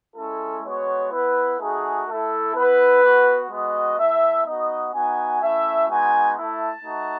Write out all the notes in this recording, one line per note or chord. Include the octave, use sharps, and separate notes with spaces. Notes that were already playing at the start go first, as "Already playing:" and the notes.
G#3 C#4 E4 A4
G#3 B3 F#4 C#5
B3 E4 B4
A3 D#4 F#4 G#4
A3 A4
E4
B3 E4 B4
B3 F#4
G#3 B3 F#4 D#5
A3 E4 E5
B3 D#4 F#4 D#5
B3 D#4 F#4 G#5
A3 C#4 E4 E5
G#3 B3 D#4 F#4 G#5
A3 E4 A5
A3 D#4 F#4